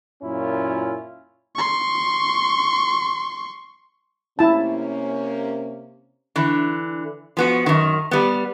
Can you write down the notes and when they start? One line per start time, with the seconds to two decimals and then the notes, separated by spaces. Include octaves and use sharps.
0.23 F#2 A#2 C#4 E4 F4
1.56 C6 C#6
4.39 C3 A#3 C#4 E4 A5
6.36 D3 E3
7.37 F3 B3 F#4
7.66 F#2 D#3
8.11 G3 B3